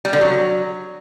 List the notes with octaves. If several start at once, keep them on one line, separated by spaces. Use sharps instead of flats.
G3
D3
F#3